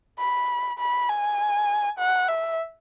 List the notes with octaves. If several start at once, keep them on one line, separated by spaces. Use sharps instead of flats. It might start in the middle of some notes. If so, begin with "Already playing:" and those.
B5
B5
G#5
F#5
E5